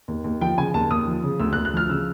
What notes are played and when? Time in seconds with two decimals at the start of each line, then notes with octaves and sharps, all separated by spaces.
0.08 D#2
0.24 D#2
0.41 F3 G5
0.58 C#3 G#5
0.74 D#2 A5
0.91 D#2 D#6
1.07 F3
1.23 C#3
1.40 D2 E6
1.53 F#6
1.56 D2
1.65 F#6
1.73 F3 F6
1.90 C#3 E6